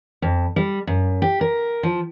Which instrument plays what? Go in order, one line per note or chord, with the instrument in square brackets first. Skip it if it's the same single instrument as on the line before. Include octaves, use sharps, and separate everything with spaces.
[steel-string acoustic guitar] F2
G3
F#2
G4
A#4
F3